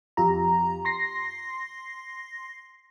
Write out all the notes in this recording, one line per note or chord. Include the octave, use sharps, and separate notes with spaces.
F2 F4 G4 A#5
C6 A#6 C7